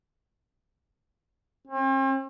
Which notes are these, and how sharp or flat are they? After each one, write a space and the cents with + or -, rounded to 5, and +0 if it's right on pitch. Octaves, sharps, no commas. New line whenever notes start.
C4 +45